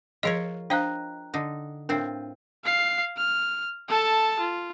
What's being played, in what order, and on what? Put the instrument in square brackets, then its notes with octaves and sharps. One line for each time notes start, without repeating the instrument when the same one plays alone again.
[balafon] F3 G#4 D#5 [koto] F4 A#4 C#5
[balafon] D4 C5 F5 [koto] D#5 [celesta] G5 A#5 F#6
[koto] D3 D#4
[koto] A2 C4 F4 [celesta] D4 [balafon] A#4
[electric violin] F5 C7
F6
A4 A5
F4